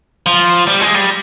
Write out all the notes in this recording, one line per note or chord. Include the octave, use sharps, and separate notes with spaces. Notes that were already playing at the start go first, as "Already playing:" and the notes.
F3
G3
G#3
G3